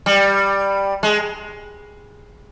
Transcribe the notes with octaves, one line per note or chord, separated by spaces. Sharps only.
G3
G#3